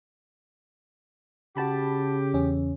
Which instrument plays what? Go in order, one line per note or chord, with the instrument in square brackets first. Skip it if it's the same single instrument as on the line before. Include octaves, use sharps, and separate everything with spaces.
[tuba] C#3 [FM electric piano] F#4 A5 B5 [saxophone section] G4
[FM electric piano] E2 C#4